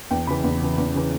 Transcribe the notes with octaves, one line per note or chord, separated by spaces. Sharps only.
E2 G5
C#3 E3 B5
E2
C#3 E3
E2
C#3 E3